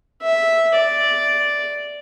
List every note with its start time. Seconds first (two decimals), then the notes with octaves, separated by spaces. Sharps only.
0.22 E5
0.75 D5